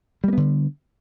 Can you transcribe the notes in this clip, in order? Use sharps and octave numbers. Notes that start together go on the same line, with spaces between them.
D3 G3 A#3 B3